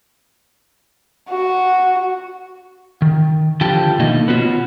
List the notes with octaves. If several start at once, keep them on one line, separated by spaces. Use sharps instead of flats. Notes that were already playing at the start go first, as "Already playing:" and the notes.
F#4
D#3
D3 F3 F4 G4 G5 A5
B2 D#3 A3 A#3 D#4 D#5
B3 C#4 F4 F#4